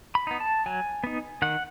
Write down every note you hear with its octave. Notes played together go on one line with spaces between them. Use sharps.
B5
B3 D#4
A5
F#3 G#5
B3 D#4
D#3 F#5